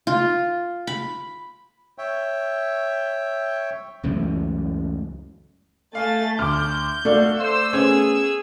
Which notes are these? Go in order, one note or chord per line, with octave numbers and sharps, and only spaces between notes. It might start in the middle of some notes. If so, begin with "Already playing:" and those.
F4
B5
C#5 E5 G5
C#2 F#2 E3 A3
A3 F5 G#5 A6
D2 D6 F6 G6
A3 F#4 D5 F5
C5 E6
B3 C#4 G#4